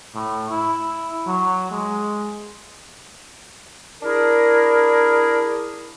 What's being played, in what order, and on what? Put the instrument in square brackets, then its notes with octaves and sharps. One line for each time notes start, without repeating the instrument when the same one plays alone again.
[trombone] A2
E4
F#3
G#3
[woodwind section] D4 E4 G#4 A#4